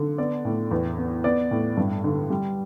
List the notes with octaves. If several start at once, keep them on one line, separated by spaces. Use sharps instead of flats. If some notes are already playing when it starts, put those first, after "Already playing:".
Already playing: D3
B3 D5
A2
E2
B3
B3 D5
A2
G2
D3
G3